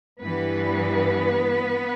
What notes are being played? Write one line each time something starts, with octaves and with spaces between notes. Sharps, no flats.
G2 E3 G3 B3 B4